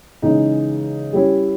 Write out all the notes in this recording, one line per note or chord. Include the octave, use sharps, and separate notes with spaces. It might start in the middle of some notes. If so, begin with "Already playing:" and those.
C#3 E3 G#3 D#4 G#4
G3 C#4 E4